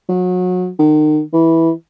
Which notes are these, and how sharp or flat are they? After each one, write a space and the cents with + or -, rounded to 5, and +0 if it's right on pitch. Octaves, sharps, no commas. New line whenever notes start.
F#3 -30
D#3 -35
E3 -10